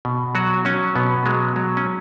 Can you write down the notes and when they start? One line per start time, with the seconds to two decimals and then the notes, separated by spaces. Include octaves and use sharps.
0.05 B2
0.35 F#3 F#4
0.65 F#3 C#4
0.95 B2 B3
1.26 F#3 G#3
1.56 F#3
1.77 C#4